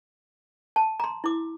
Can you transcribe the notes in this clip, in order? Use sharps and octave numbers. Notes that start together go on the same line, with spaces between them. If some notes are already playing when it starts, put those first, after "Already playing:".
A5
A#5 C6
E4 D6